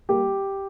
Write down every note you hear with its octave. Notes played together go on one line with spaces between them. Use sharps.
G3 A#3 G4